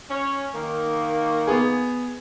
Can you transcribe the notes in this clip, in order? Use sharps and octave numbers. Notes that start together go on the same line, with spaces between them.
C#4
D#3 A#3
B3 G#4